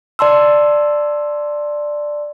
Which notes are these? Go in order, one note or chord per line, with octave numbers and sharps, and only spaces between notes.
D5 A5 C6 E6